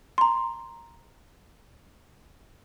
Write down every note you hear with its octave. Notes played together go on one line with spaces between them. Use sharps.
A#5 C6